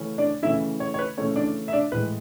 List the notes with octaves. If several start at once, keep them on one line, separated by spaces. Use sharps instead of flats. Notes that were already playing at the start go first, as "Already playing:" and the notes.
Already playing: C#3 E3 A3 C#4
D4 D5
C#3 E3 A3 C#4 E4 E5
C#5
C#5
B4
C#3 E3 A3 C#4 C#5
D4 D5
E5
D4 D5
A2 E3 G#3 B4